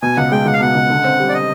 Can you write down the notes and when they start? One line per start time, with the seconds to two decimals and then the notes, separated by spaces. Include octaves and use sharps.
0.02 B2 G#5
0.17 C#2 F#5
0.31 G#3 G5
0.46 C#2 F#5
0.53 F5
0.60 B2 F#5
0.75 C#2
0.90 D3
1.04 C4
1.20 G3
1.29 D5
1.34 D#5